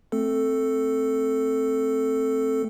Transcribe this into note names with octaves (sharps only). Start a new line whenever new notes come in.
A3 C4 A4